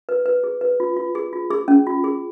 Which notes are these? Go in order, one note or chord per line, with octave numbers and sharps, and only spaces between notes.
B4
B4
G#4
B4
F4
F4
G#4
F4
G#4
C#4
F4
G#4